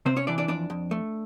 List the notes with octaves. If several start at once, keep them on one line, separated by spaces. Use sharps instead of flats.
C3 C4 C5
C#4 C#5
E3 D4 D5
D4 D5
F2 D4 D5
F2
A3